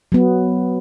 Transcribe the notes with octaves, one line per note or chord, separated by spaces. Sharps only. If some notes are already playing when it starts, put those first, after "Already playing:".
F#3 B3